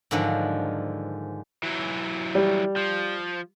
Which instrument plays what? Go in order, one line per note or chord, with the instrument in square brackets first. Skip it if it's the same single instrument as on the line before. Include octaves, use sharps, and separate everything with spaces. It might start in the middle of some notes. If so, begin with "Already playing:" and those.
[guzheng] G#2 D3 D#3 F3 F#3
[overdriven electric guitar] E3 F#3
[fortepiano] G3
[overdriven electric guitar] F3